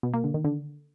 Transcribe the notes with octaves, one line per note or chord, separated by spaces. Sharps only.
B2
A#3
D3
D#3
D3